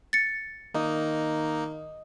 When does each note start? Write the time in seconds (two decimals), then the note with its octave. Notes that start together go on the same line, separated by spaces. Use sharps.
0.13 A6 C#7
0.74 D#3 A#3 D#4 D#5